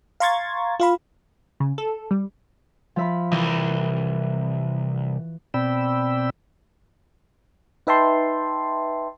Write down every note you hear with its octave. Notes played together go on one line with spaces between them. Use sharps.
F5 A#5 C6 C#6 G#6 A6
F4 F5 B5
C#3
A4
G3
F3 E5 B5
C2 E3
B2 C4 D5 G5 B5 E6
D#4 B4 E5 G5 A5 C6